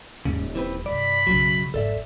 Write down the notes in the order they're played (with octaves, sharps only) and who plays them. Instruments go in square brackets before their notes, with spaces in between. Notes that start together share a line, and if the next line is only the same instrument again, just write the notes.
[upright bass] D#1 [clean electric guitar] G#2 C#3
[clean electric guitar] E3 C4 B4
[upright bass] G2 C3 [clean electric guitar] D5 [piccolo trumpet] B5
[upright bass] B1 C#3 [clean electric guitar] F#2 F#3
[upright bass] G#1 F2 [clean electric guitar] A4 D5 E5